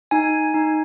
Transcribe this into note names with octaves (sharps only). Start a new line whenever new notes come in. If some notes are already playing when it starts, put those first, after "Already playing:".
D#4 G#5
D#4